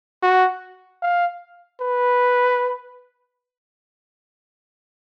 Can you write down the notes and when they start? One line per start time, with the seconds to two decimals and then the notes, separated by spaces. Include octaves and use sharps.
0.23 F#4
1.02 F5
1.81 B4